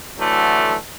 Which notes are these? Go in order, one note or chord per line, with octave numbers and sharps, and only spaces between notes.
D3 E3 F#3 A3